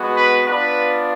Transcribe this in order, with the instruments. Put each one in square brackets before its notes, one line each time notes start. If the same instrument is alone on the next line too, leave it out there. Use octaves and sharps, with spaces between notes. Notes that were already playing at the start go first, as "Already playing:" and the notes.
Already playing: [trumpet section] G#3 B3 F#4
B4
B3 D4 F4 B4